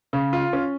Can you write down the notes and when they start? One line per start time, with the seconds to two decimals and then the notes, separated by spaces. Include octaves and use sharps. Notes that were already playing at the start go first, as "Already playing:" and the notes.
0.13 C#3
0.33 F4
0.53 C#4